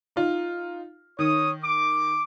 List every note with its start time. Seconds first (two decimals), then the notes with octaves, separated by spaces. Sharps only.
0.16 D#4 F4
1.19 D#3 C#5 D#6
1.63 D6